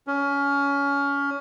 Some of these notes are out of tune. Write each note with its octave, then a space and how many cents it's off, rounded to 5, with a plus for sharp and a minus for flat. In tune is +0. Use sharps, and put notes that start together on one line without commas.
C#4 +25